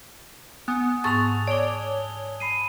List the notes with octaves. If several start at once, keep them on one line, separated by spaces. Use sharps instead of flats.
B3 G#5 D#6 F#6
F#6
G#2 A5 C#6 E6 A6 F7
C#5 D5 A5 D6 G7
B5 C7 D#7